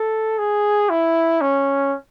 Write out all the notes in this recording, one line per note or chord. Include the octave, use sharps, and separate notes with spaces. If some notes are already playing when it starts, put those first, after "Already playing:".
Already playing: A4
G#4
E4
C#4